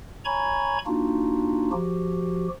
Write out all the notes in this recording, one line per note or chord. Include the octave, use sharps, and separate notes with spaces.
C#5 G#5 A#5 B5 C#6 G#6
A#3 D4 D#4 F4 F#4
F3 F#4 G4